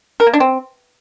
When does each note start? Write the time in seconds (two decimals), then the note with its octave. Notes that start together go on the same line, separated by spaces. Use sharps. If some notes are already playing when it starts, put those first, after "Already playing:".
0.20 A#4
0.27 A#3
0.34 D4
0.40 C4